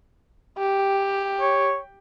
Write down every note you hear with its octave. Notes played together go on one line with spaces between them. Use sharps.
G4
C#5